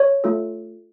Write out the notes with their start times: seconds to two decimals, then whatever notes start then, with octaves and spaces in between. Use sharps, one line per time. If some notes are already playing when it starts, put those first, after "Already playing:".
Already playing: C#5
0.24 A3 F4 A4